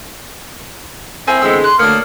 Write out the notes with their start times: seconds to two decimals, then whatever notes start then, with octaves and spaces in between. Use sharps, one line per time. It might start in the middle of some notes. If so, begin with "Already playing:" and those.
1.27 C4 E4 A#4 G#5
1.42 D3 E3 G#3 B3 E6
1.64 C6 F#6
1.79 D2 A#3 C#5 D5 A5 D#6 F6